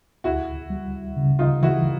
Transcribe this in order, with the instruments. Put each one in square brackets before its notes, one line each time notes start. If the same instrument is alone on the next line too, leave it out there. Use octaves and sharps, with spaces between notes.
[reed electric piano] D2 [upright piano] E4 F#4
[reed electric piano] G3
C#3
[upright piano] D#4 F4
[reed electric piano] E3 [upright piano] E4 F#4